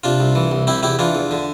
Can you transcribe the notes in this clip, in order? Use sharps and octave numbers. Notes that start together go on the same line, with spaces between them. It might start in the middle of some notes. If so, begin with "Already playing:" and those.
C3 D4 F4
C2
E3
C2
C3 E4 G4
E2 E4 G4
E3 D4 F4
E2
D3